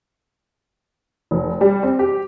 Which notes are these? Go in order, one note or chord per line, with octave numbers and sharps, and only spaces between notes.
F1
G3
C4
G4